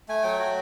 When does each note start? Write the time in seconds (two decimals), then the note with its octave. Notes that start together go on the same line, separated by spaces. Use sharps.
0.08 A3 G#5
0.23 F#3 G5
0.39 F#4